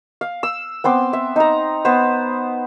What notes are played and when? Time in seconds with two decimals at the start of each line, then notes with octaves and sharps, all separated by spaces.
0.21 F5
0.43 E6
0.84 B3 C4 C6 D6
1.13 E5
1.36 D#4 A#5
1.85 B3 B4 C5